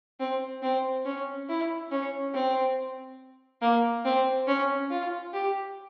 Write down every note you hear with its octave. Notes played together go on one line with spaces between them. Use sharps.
C4
C4
C#4
E4
C#4
C4
A#3
C4
C#4
F4
G4